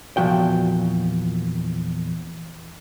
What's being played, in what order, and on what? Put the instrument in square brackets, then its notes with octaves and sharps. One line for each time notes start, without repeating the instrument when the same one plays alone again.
[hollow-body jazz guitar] E2 A#2 F3 F#4 G5